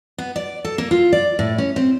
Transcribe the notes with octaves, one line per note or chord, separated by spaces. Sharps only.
B3
D5
A4
A#3
F4
D5
A2
C#4
C4